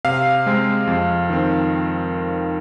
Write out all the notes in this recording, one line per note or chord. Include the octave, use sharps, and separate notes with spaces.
C3 F5
G#3 C4
F2
D#3 C4